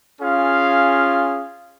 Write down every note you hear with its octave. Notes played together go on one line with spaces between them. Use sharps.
C#4 F4 G#4 F5